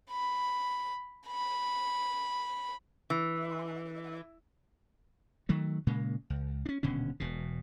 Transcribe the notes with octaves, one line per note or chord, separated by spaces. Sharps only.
B5
B5
E3
D#3 F#3 A3
A#2 C#3 G#3 A#3
C#2
C#4 D4
D#1 B2 D3 C#4
E1 B2